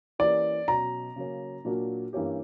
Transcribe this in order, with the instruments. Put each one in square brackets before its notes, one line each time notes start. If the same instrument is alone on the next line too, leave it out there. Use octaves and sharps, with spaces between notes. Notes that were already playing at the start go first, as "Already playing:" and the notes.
[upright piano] E3 A#3 C#4 G4 [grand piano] D5
[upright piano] B2 F#3 C#4 F#4 [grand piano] A#5
[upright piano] C#3 F#3 A#3 C#4
A#2 F#3 A#3 D4 F#4
G2 E3 A#3 C#4 G4